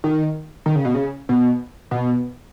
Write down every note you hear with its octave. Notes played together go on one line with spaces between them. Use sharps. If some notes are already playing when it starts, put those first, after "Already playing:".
D#3
D#3
C#3
B2
C#3
B2
B2